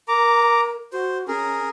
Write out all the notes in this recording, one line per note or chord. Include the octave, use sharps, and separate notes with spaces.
A#4 A#5 D6
F#4 C5
C#4 G#4 A#4